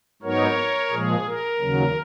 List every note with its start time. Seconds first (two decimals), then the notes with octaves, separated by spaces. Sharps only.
0.22 G#2 F#3 B3 D#4 A#4 C#5
0.91 A#2 F3 G#3 G#4
1.26 A#4
1.60 D#2 C#3 F#3